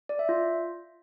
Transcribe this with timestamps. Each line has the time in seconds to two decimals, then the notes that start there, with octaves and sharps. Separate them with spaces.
0.09 D5
0.19 E5
0.29 F4